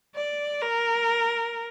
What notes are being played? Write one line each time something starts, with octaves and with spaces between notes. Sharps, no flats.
D5
A#4